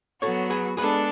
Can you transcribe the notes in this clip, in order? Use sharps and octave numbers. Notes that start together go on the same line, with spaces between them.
F#3 B3 F#4 A4 C#5
G#4 B4
G#3 B3 D4 G#4 A4 B4